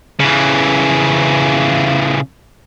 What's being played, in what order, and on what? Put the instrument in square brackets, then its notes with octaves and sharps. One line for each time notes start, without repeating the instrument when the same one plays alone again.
[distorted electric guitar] C#3 E3